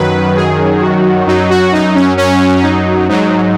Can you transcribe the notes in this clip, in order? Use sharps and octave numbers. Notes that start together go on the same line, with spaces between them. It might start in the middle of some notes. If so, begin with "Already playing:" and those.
Already playing: F#2 D#3 F#3 B4
G#4
F#4
F#2 F#3 D#4
F#4
D#4
C#4
C#4
D#4
G#2 F#3 D#4